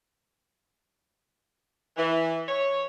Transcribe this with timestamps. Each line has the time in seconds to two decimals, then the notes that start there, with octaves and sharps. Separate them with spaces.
1.97 E3
2.48 C#5